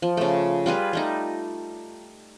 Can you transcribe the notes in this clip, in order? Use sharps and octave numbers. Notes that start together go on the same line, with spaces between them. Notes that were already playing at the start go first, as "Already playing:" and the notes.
F3
C#3 A3
G3 F4 G#4 B4
G3 A3 D#4